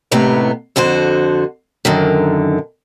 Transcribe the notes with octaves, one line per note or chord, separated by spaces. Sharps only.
D#2 A2 C3 B3 A#5
F2 D3 F#4 C5
F#2 D3 D#3